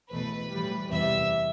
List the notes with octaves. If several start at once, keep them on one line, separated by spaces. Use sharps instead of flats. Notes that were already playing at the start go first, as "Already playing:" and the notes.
E2 B2 A3 B4
A2 E3 G3
E2 C3 G3 E5